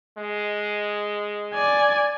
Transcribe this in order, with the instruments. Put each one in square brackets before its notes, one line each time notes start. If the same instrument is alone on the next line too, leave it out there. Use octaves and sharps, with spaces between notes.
[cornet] G#3
[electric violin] D5 G#5